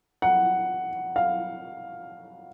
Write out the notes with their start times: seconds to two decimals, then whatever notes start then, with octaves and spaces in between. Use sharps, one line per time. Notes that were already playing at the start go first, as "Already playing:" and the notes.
0.22 F#5
1.16 F5